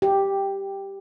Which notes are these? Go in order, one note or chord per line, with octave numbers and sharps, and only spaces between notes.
G4